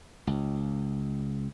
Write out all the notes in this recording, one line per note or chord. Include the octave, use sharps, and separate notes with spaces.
C#2